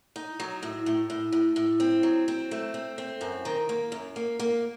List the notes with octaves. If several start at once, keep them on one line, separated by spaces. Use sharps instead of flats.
D#4
F#3
A2
A2
A2
A2
A2
C4
F#3
C4
A3
C4
C4
F#2
D#3
A#3
F#2
A#3
A#3